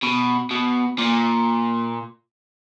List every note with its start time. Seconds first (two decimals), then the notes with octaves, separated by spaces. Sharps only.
0.03 B2
0.51 B2
0.99 A#2